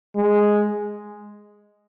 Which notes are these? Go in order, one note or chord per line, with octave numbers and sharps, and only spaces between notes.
G#3